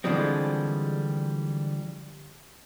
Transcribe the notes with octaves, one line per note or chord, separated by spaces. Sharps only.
D3 E3 F3 G3 G#3 C4